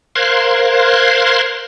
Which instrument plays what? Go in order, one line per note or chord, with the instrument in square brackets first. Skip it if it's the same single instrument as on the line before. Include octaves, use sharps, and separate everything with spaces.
[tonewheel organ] A#4 C5 F5 C6 F#6 G#6